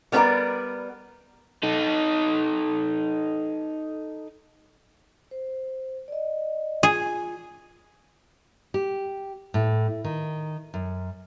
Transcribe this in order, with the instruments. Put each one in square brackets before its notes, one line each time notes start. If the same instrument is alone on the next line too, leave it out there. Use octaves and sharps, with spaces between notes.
[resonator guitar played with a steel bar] G3 B3 C#4 F#4 A#4 D5
[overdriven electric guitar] D#4 A4
[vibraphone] C5
D5 D#5
[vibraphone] F4 [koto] G#4
[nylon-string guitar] G4
A2
D#3
F#2